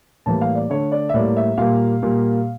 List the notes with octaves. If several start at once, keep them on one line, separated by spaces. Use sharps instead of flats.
A2 E3 G3 A#3 A5
F5
D5
D3 A3 C#5
D5
E5
A2 G3 A#3 D5
E5
A#2 G3 A#3 F5
A#2 G3 A#3